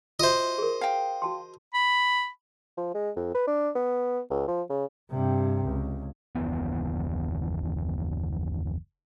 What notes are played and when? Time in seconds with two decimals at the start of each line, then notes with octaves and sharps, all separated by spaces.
0.20 F4 F#4 C5 D#5 E5
0.58 G#4 A#4
0.81 F5 G5
1.22 F#4 A5 C6
1.74 B5
2.77 F3
2.94 G#3
3.16 F2
3.35 B4
3.47 D4
3.76 B3
4.30 C#2
4.48 F3
4.70 C#3
5.10 G2 C3
5.64 C#2
6.35 F#1 D#2 E3 B3